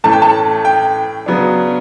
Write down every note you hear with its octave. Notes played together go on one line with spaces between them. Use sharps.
A2 E3 A3 C#4 A5
G5
A5
G5
C#3 F#3 B3 D4